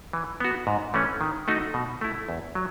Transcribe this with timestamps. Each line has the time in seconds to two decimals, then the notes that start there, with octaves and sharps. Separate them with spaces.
0.13 E3
0.40 B3 F#4
0.67 G#2
0.94 E3 A3 C#4
1.21 D#3
1.48 A3 D#4 F#4
1.74 B2
2.01 A3 E4
2.29 E2
2.55 F#3